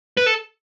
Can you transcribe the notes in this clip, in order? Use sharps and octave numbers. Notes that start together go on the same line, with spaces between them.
B4
A4